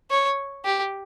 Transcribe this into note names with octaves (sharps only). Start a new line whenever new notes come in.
C#5
G4